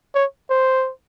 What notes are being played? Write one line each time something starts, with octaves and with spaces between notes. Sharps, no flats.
C#5
C5